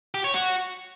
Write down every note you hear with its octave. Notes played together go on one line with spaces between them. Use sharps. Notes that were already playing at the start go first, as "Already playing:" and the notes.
G4
C#5
F#4